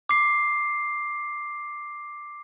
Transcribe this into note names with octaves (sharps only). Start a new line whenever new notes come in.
D6 C7